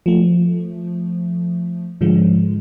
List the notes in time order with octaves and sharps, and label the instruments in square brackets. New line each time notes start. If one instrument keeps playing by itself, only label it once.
[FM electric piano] F3 A3
G#2 D3 F3 G#3